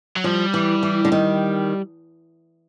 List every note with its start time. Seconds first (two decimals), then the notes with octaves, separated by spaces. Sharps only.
0.16 F#3
0.24 F3 G3
0.54 E3
0.83 E3
1.05 D3
1.12 D#3